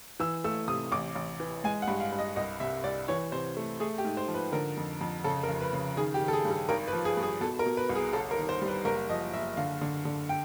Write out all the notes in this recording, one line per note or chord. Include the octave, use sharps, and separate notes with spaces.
E3 E6
A3 E6
C3 D#6
A1 D6
A1
E3
G#3 G#5
F#5
G2
F5
G2
D#5
C2 D#5
C3 E5
C2 D5
E3 C#5
C3 C5
A3
A3 G#4
G4
G#2
C5
F3
B4
D3 A#4
F2
F2
C#3 A4
A#4
F1
B4
C#3
D#3 G#4
G4
D#3
A4
G#4
G2
A4
G#1 A#4
B4
F3
G#4
G2
G#4
B2 A4
A#4
B2
B4
C2
G#4
G1 A4
A#4
D#3
C5
G3
B4
F#1 A#4
F3 D#5
F#1 E5
D3 F5
D3
D3
G5